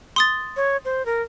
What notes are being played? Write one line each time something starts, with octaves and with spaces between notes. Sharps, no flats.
C6 D#6 A6
C#5
C5
A#4